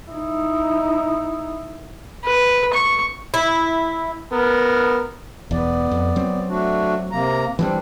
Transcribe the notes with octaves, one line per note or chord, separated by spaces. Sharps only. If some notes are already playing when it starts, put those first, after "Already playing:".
D#4 E4
B4
C#6
E4
B3 A#4
E1 E2 B3 D5
F2
F#3 C4
A3 D4 F#4
C3 A#3 A#5
E3 F3 G3 C4 D4